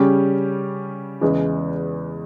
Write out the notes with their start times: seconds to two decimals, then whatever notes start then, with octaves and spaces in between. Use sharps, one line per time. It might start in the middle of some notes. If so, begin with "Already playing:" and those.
Already playing: C#3 G3 C#4 G4
1.21 E2 C#3 E3 G#3